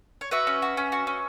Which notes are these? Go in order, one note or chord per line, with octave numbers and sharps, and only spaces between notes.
C#5
F#4 B4 E5
C#4
F#4
C#4
F#4
C#4